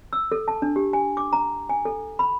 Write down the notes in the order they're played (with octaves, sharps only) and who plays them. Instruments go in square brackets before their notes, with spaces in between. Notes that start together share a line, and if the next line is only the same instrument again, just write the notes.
[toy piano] E6
A4
A5
D4
G4
G#5
D6
A#5
G#5
A4
B5